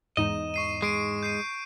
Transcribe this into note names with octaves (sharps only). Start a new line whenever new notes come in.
E2 G#2 D#4 D#5 E7
C#6 C7 D#7
G#3 C7 D7 D#7
G6 C7 D#7